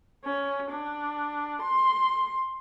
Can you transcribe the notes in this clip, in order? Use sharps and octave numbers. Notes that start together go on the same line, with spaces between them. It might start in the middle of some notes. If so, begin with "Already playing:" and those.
C#4
D4
C6